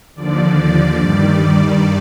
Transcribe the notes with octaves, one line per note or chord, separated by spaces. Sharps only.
D#2 D3 F3 D5
D5
G2 D#3 G3 D5
D5